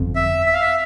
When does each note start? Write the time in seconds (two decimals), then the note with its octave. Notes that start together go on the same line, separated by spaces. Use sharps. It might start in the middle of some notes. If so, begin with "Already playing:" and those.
Already playing: G1 F2
0.16 E5
0.46 E5
0.53 F5
0.62 E5